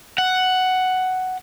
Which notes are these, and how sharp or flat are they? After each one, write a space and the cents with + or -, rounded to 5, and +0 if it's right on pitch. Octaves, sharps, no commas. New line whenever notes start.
F#5 +5